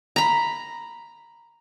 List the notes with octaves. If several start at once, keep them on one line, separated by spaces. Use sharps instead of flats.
A#5 B5